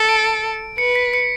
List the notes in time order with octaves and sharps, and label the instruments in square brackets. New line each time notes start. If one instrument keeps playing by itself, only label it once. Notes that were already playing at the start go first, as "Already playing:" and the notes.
Already playing: [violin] A4
[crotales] D7
[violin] B4 [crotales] C#7
[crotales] B6
C#7